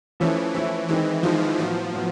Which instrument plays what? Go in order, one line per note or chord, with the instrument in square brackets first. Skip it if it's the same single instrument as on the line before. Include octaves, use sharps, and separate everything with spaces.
[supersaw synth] E3 [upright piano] F3 A3 C#4 E4
[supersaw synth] E3 [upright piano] F3 A3 C#4 E4
[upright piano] D#3 G#3 C4 D#4 [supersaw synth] E3
[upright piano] D#3 G#3 C4 D#4 [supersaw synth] F3
[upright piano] A2 F#3 B3 [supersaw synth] F3
[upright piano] A2 F#3 B3